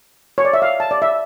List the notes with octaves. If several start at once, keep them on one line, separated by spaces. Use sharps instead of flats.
C#5
D5
E5
F5
A5
D5
E5